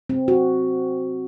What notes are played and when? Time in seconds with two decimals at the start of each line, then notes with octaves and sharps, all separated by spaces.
0.09 C4
0.28 F#4